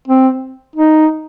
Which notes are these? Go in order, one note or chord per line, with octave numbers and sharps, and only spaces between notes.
C4
D#4